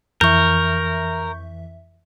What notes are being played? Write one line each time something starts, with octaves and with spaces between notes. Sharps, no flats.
F2 E3 A#4 E5 C#6 G6